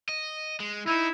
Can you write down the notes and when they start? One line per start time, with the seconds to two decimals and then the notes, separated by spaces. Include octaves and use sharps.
0.09 D#5
0.60 G#3
0.87 D#4 E4